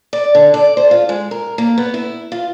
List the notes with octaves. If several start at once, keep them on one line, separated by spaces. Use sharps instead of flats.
D5
D3
D5
C5
F4
G#3
A#4
A#3
B3
E4
F4